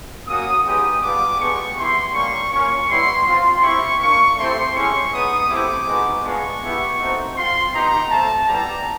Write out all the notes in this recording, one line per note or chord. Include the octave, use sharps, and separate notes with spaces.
A#3 C#4 F#4 D#6
G#3 B3 D#4 G4 D#6
G3 B3 D4 F4 D6
G#3 B3 D4 G4 C#6
B3 E4 G4 C6
G3 A#3 C#4 C#6
A#3 C#4 F4 C#6
G3 B3 E4 C6
C4 F4 C6
C4 E4 G4 C#6
A#3 D4 F4 C#6
A3 C4 E4 G4 C6
G#3 C#4 E4 G4 C#6
G#3 B3 D#4 D#6
A3 C4 E4 G4 D6
G#3 B3 D#4 F#4
G#3 B3 D4 F4 C#6
B3 E4 G4
A3 C4 D#4 F#4
C4 F4 C6
B3 D#4 G4 A#5
A3 C4 F4 A5
G3 B3 E4 G4 A#5